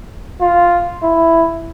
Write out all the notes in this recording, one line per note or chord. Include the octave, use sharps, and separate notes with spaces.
F4
E4